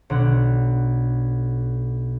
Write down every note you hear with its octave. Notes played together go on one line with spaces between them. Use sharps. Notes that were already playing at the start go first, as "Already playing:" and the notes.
B1 D3 C#5 F#5